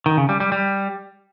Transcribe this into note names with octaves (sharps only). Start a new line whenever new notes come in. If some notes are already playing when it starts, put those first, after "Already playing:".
D#3
C#3
G3
G3
G3